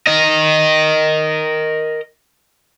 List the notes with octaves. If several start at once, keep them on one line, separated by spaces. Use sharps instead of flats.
A#4 D#5